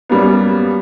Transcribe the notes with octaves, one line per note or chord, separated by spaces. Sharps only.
F#2 G3 A#3 B3